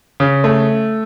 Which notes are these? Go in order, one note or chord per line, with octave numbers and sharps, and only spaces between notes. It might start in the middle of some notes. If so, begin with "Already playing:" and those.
C#3
A3